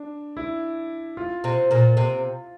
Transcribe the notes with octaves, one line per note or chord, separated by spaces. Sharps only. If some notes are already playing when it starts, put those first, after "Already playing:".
Already playing: D4
E4
F4
C3 C4
A#2 A#3
C3 C4